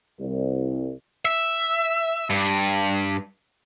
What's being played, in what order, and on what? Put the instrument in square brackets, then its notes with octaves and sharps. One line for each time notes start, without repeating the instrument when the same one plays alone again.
[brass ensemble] C2
[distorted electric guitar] E5
G2